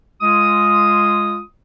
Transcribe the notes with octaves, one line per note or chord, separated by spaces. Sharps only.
G#3 F4 D#6